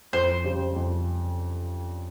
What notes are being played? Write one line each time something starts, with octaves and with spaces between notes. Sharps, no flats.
F2 C5
C#3 G3 C#4 G4
F2